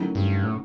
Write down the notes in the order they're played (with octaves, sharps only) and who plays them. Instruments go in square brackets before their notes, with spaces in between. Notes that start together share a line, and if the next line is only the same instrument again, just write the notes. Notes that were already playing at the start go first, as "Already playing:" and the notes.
Already playing: [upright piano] D#3 F#3 A3 C#4 E4
[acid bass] G2
A2